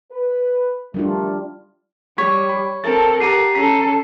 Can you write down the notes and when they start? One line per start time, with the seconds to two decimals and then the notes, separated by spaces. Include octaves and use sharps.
0.12 B4
0.94 D#3 G3 A3 D4 F4 A#4
2.18 G3 C#5 B6
2.49 B5
2.84 C4 A4 A#4 A5 A6
3.20 G4 F#5 A#5 C7 D#7
3.55 C#4 A4 A#5 B6